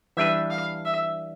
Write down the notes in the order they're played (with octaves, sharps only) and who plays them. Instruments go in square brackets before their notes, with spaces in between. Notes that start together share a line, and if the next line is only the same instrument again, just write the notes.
[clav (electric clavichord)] E3 G3 D4 G4 B4 [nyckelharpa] E5
[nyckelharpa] F5
E5